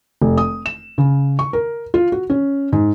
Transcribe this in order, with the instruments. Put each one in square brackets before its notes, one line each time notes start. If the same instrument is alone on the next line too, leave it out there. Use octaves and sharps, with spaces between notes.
[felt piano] F1
D#6
E7
C#3
C#6
A#4
F4
F#4
C#4
G#2